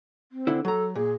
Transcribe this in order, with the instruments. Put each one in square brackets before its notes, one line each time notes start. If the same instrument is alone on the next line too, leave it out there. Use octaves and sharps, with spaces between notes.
[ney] C4
[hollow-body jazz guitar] D3 E4
[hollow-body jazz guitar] F#3 A#5 [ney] A4
[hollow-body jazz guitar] A#2 [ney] G#4